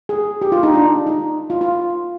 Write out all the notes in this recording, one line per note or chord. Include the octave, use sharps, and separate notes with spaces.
G#4
G4
F4
D#4
D4
D#4
F4
F4